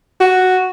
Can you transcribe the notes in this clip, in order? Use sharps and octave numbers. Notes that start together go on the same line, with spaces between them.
F#4